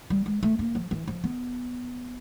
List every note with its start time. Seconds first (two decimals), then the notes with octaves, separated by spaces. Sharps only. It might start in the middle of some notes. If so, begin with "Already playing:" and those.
0.10 G3
0.26 G#3
0.43 A3
0.59 A#3
0.75 F3
0.91 E3
1.08 F3
1.24 B3